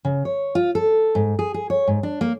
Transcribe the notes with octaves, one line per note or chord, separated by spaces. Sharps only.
C#3
C#5
F4
A4
G#2
G#4
G#4
C#5
G#2
D4
A#3